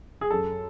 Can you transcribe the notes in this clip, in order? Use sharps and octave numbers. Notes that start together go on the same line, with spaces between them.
G#4
F#2 A4